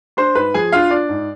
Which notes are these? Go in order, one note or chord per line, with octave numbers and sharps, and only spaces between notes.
D4 C5 C6
G#2 B4 B5
F3 G#4 G#5
D4 F4 F5
D4 D5
G#2